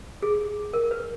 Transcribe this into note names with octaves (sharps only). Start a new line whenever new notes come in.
G#4
A#4
B4